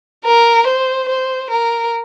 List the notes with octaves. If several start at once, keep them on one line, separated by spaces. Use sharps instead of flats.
A#4
C5
C5
A#4